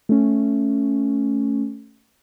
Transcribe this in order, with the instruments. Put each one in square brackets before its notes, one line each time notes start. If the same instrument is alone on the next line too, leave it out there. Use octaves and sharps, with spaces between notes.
[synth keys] A3 C#4